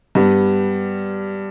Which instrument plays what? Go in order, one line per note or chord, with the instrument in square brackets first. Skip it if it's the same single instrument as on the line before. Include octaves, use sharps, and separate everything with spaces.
[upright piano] G2 G3 B3